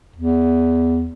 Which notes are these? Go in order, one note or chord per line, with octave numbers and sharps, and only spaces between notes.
E2